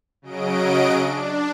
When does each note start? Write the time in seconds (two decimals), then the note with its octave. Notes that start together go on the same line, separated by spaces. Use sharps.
0.22 C#3 F#3 D#5 D7
0.99 D4